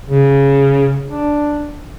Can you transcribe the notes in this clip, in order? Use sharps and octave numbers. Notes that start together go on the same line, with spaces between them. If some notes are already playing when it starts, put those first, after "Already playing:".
C#3
D4